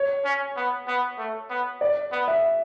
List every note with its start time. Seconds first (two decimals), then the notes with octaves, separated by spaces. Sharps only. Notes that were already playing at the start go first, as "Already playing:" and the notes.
Already playing: C#5
0.25 C#4
0.56 B3
0.87 B3
1.19 A3
1.50 B3
1.81 D5
2.12 B3
2.28 E5